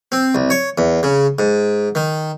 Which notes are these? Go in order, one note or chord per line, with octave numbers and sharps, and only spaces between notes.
C4
C2
C#5
E2
C#3
G#2
D#3